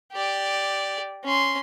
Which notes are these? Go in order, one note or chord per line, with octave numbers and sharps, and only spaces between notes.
G4 D5
C#4 C6